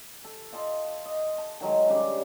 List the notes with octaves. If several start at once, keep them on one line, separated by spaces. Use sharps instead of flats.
A4
F4 D#5 A5 C6
D#5
A5
D#3 F#3 G#3
C#3 G3 D4 D#4